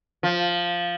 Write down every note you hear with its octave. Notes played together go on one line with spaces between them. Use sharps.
F3